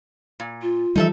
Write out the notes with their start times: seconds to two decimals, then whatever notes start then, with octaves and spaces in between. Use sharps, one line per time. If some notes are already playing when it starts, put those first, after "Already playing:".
0.40 A#2
0.62 F4
0.96 E3 F3 G3 D#4 A4 E5